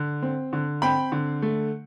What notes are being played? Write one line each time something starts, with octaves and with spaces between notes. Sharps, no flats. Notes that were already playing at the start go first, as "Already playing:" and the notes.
Already playing: D3
C4
D3
C4 G5 B5
D3
A3